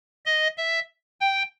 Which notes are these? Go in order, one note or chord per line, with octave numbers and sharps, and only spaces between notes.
D#5
E5
G5